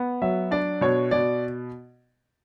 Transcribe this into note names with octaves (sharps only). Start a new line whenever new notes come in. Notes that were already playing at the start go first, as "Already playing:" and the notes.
Already playing: B3
F#3 E5
D4 D5
B2 C#5
B2 D5